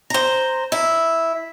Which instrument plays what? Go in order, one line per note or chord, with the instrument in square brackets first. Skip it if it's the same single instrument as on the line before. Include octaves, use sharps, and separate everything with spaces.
[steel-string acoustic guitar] C5 A#5
E4